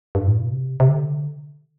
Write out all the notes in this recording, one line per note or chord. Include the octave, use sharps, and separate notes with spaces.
G2
A2
B2
C3
C3
D3